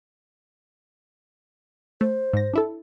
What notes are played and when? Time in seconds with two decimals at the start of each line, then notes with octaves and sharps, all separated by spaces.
2.01 A3 C5
2.33 G#2 A#6
2.54 D4 E4 A4